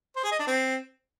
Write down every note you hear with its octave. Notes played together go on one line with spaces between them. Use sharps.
C5
G#4
D#5
D4
C4